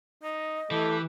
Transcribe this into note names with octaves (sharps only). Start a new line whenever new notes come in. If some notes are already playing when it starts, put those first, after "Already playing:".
D#4 D#5
E3 A3 G4